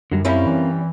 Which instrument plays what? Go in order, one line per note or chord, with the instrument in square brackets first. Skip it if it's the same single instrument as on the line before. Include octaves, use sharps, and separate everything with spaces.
[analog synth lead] F#2 [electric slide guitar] D3 F#3 G3
[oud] G3 C#4 E4 [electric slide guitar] C4 A#4 F5
[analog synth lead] E3